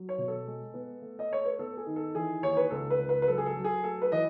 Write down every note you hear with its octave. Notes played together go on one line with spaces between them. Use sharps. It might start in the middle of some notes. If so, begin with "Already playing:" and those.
Already playing: F#3
C#5
B2
A4
G#3
B3
A3
D#5
A3 C#5
B4
B3 A4
G#4
D#3
A4
E3 G#4
D#2 C#5
B4
C#2 A4
B4
C#2
B4
B4
F#3 A4
G#4
A4
F#3
G#4
A3 A4
B4
E3 D#5